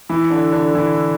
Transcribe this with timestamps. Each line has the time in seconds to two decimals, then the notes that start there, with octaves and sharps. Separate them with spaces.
0.09 E3 E4
0.31 D3 D4
0.52 D3 D4
0.75 E3 E4